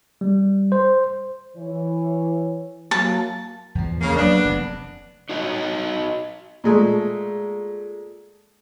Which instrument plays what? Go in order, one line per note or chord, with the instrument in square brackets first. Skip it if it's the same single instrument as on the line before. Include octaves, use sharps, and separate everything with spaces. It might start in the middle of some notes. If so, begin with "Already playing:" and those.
[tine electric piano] G3
C5
[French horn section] E3 C#5
[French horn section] F#3 A#3 E4 [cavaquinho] A5
[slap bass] E2 F3
[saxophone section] C#3 A#3
[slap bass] F#3 A#3 [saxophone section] B3 D4
[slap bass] F1 C3
[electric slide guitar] D#4 F#4 C#5 D#5
[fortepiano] A#2 G#3 A3